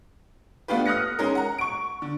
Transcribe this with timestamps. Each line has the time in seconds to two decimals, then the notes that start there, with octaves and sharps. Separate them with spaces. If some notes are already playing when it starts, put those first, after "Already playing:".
0.68 A3 B3 D4 F4 G4 B4
0.86 D#6 F6 F#6 A#6 C#7
1.19 G#3 C#4 D#4 A#4
1.35 F#5 A#5
1.58 C#6 D7
2.02 D3